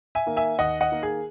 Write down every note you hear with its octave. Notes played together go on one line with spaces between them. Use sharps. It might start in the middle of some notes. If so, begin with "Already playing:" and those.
E5 G#5
D#3 A#3
E5 G#5
D#2 D#5 F#5
D#5 F#5
D#3 A#3
G#4